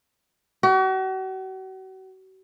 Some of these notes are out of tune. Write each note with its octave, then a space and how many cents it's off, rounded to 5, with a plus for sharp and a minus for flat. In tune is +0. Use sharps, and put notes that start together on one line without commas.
F#4 +40